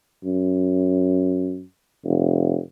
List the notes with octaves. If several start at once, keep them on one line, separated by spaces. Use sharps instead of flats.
F#2
F1